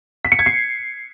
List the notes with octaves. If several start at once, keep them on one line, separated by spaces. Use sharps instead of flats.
B6
C#7
G#6
C7